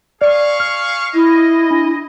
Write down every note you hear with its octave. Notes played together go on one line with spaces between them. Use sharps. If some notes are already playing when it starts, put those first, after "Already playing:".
G#4 D5 F5 C#6
F6
E4 D#5
D4